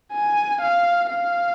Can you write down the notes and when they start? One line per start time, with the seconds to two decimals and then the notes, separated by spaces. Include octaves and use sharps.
0.13 G#5
0.61 F5
1.10 F5